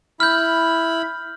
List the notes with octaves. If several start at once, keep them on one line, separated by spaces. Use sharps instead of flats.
E4 B5 F6 G6